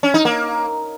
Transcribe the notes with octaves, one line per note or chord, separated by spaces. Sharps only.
C#4
D#4
A#3